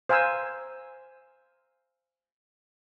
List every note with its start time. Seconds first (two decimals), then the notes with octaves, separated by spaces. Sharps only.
0.09 C5 F5 G#5 A#5 E6